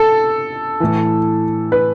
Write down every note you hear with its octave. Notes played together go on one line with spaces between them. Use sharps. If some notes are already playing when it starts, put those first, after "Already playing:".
Already playing: A4
A2 E3
B4